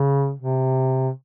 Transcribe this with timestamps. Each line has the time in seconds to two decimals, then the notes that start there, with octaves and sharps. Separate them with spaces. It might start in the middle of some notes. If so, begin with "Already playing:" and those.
Already playing: C#3
0.39 C3